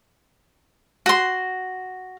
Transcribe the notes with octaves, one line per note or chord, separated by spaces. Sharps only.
F#4 C6